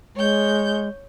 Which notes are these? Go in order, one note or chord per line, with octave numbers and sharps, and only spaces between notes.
G#3 C#5 G6